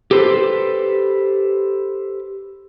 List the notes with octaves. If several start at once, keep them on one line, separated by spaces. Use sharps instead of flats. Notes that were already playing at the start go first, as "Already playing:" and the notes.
G4 A4 B4 C5